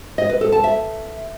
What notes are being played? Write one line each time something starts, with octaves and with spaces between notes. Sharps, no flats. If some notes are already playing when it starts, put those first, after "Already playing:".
D#5
B4
A4
A5
E5